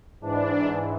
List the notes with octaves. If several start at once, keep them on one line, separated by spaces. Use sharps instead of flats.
G#2 E3 D4